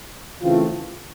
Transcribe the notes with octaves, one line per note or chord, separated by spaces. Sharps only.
C#3 E3 A3 C4 F4